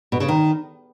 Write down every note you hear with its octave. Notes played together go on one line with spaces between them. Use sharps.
B2
C#3
D#3